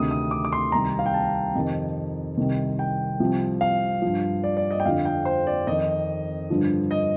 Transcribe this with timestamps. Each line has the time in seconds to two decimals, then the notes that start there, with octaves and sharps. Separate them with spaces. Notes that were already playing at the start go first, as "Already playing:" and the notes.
Already playing: D2 C3 D#3 D#6
0.11 D#6
0.31 D6
0.45 D6
0.53 C6
0.72 C2 C3 D#3 A#5
0.99 F5
1.06 G5
1.14 A5
1.55 F2 C3 D#3
2.37 C2 C3 D#3
2.79 G5
3.19 C2 C3 F3
3.61 F5
4.02 F3
4.07 G2
4.44 D5
4.57 D5
4.71 D#5
4.80 G5
4.85 F2 D3 F3 F5
5.05 G5
5.25 C5
5.47 D5
5.67 F2 D#3 D#5
6.50 G2 D3 F3
6.91 D#5